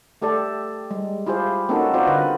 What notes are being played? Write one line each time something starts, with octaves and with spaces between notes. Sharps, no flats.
A3 G4 A4 D5
G3 G#3
E4 F4 G4 G#4 C5
A#3 C4 C#4 D#4 F#4 A4
C4 F4 F#4 A#4 C5 D5
D3 B4 D#5